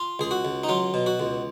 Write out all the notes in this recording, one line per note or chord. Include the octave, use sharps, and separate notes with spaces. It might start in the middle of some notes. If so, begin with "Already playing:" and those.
Already playing: F4
C#2 G#4
F#4
C#2
D#4
F#3 F4
B2
F#4
C#2